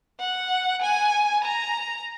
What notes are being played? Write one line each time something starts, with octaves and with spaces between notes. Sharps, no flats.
F#5
G#5
A#5